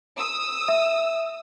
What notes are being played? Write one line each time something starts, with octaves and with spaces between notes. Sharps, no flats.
D#6 E6
E5